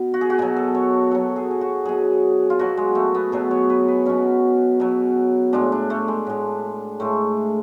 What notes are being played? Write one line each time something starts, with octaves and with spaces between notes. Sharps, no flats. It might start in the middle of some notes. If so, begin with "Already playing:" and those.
Already playing: B2
F#4
G#4
F#4
B2 F#3 G#4
A4
C#5
B2 F#3 A4
G#4
G#4
F#4
B2 F#3 G#4
F4
B2 F#3 F#4
G#3
A3
B3
B2 F#3 G#4
C#5
B4
B4
B2 F#3 C#4
B2 F#3
A2 G#3 D4
D4
A3
G#3
A2 G#3
A2 G#3 A3